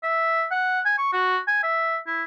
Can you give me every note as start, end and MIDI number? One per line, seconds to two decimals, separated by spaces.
0.03 0.45 76
0.51 0.80 78
0.85 0.94 80
0.98 1.10 85
1.13 1.37 66
1.47 1.63 80
1.63 1.97 76
2.07 2.24 64